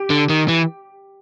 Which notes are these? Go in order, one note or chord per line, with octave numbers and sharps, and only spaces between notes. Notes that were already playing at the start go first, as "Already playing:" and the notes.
Already playing: G4
D3
D#3
E3